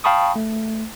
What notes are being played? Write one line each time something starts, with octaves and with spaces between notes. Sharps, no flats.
F5 G5 A5 B5 C#6 D#6
A3